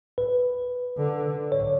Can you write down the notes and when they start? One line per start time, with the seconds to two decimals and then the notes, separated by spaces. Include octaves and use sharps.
0.18 B4
0.98 D3
1.52 C#5